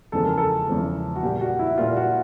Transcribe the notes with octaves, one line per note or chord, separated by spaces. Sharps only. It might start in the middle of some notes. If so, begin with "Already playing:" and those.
E2 C#3 F3 G#3 A4
A#4
A4
E2 C#3 F3 G#3
F#4
A#2 G3 G4
F#4
E4
A#2 G3 F4
F#4